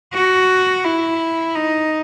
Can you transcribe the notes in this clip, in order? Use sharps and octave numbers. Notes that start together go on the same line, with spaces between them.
F#4
E4
D#4